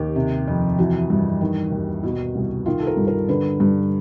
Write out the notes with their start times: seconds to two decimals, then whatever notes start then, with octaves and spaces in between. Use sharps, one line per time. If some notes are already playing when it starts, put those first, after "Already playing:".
Already playing: D#2 G4
0.16 C3
0.48 F2
0.78 E3 F#4
1.10 G2
1.41 D#3
1.72 D#2
2.03 B2
2.35 C2
2.66 D#3 F4
2.80 A4
2.87 A#4
2.97 G2
3.08 A#4
3.29 D3 B4
3.60 G2